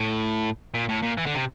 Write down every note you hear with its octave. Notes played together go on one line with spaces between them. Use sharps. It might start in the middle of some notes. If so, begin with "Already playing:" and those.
Already playing: A2
A#2
A2
A#2
E3
D3
C3